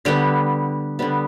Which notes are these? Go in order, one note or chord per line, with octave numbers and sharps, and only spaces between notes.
D3 G3 B3 G4
D3 G3 B3